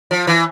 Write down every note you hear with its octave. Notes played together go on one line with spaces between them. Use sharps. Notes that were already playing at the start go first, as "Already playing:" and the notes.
F3
E3